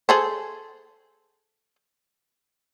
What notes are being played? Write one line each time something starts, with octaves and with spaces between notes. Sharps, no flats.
G#4 A4 C5